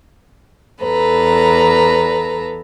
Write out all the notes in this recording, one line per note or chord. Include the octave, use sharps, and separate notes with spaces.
E2 A4 B4 A#5